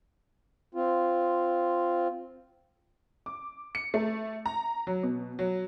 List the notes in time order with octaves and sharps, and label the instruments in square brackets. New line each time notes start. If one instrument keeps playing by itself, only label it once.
[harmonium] C4 F4
[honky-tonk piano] D6
C#7
A3
A#5
F#3
B2
F#3